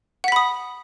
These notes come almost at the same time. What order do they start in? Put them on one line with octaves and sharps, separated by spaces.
F#5 B6 B5 D#6